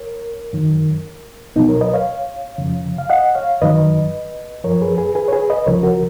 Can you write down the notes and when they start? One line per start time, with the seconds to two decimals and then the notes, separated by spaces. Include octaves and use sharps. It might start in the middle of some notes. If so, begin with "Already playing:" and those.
Already playing: A#4 C#5
0.53 F#2 D#3 F#3
1.56 C#2 B2 F#3 B3 D#4
1.69 A#4 C#5
1.81 B4 D#5
1.94 C#5 F5
2.58 F2 C#3 F3
2.98 F5
3.10 D#5 F#5
3.35 C#5 F5
3.62 F#2 D#3 F#3 B4 D#5
4.64 F#2 F3 A#4 C#5
4.82 G#4 B4
4.98 G#4 B4
5.15 G#4 B4
5.28 C#5
5.32 G#4 B4
5.50 B4 D#5
5.66 C#2 C#3 F3 A#4 C#5
5.83 F#4 A#4